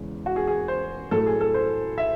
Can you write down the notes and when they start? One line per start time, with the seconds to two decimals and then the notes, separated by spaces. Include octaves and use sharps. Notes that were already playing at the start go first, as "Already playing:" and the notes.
Already playing: E2 C#3 G#3
0.26 F#4
0.36 G#4
0.47 G#4
0.68 C5
1.11 A2 F#3 A3 A4
1.27 G#4
1.41 A4
1.54 C5
1.98 E5